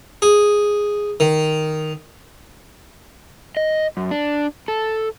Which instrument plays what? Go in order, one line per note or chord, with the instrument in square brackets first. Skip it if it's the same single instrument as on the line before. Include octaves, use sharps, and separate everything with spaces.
[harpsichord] G#4
D#3
[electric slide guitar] D#5
F#2
D4
A4